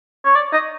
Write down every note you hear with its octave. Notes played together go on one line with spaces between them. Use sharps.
C#5
D5
D#5